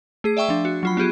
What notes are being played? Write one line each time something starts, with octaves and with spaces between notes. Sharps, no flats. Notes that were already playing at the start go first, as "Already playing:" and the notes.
A3 G#4 C7
D5 E5 G5 C#6 E6
F3 D4
F#4
F#3 F4 B5
B3 F4 G4 G#4